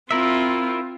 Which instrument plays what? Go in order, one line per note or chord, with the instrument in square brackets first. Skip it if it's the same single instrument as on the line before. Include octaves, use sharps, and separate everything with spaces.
[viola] C4 F4 [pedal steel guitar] E4 A#4 E5